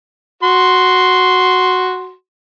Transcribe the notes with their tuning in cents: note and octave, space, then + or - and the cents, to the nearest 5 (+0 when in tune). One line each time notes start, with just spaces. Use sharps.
F#4 +0 C6 +0